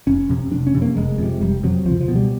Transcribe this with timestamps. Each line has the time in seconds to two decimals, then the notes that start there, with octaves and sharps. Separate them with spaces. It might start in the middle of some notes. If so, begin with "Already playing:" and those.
0.07 F1 C#4
0.29 F2 C3
0.52 F1 D4
0.67 C#4
0.75 F2 C3
0.82 A#3
0.97 F1 G#3
1.18 F2 C3
1.41 F1 G3
1.63 F2 C3 F#3
1.85 C#2 F3
2.01 F3
2.08 B2
2.15 G3